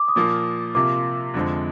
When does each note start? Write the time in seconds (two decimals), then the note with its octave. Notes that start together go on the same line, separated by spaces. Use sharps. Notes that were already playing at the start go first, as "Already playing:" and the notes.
Already playing: D6
0.08 D#6
0.16 A#2 F3 A#3 D6
0.75 C3 F3 A#3 F4 D6
1.34 F2 D3 F3 G#3 C4